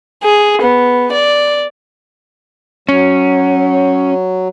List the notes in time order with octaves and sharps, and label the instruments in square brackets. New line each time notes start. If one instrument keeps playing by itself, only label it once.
[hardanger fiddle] G#4
B3
D5
[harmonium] F#3 [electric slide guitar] C#4